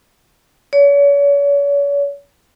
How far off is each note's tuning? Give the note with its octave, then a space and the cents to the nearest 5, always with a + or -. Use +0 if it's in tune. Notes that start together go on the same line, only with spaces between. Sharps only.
C#5 +40